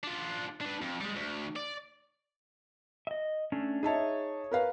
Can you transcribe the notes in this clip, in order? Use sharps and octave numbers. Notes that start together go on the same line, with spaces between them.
D4 F4
D4 B4
F2
G3 G#3
D2
D5
D#5 E5
A3 C#4 D4
D#4 G#4 C#5 E5 A5
A#4 B4 F5